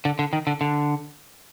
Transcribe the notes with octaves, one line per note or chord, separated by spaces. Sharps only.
D3
D3
D#3
D3
D3